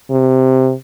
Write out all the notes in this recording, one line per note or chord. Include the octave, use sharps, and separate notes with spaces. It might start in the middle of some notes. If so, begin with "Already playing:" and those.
C3